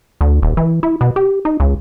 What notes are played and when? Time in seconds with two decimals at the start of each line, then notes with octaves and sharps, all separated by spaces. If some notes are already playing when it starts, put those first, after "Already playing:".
0.21 D2
0.43 D#1
0.57 E3
0.83 E4
1.01 B2
1.16 G4
1.45 D#4
1.60 C#2